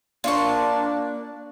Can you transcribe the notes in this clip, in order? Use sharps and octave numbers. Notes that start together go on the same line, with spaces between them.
A#3 D4 F4 C5 D5 A5 C#6